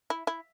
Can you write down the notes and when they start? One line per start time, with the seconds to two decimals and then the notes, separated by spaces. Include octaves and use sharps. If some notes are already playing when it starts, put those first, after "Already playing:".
0.10 E4
0.27 E4